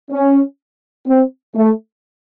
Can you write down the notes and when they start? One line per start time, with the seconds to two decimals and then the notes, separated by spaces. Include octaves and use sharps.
0.11 C#4
1.07 C4
1.55 A3